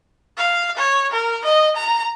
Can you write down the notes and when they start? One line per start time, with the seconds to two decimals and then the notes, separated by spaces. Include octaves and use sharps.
0.38 F5
0.77 C#5
1.12 A#4
1.44 D#5
1.76 A#5